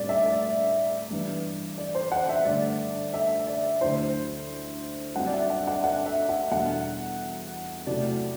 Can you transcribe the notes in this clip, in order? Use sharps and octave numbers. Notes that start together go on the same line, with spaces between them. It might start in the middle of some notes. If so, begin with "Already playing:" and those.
Already playing: A2 G3 C4 D5
E5
D5
G2 E3 B3
D5
C5
F#5
E5
G2 D3 A3 D4 D5
E5
D5
D2 D3 F#3 A3 E4 C5
G2 F#3 C4 F#5
D5
E5
F#5
F#5
F#5
E5
F#5
E2 B2 G3 D4 F#5
C3 F#3 A3 C4 E4 D5